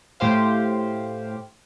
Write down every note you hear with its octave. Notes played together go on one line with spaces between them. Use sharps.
A2 G4 C5 F5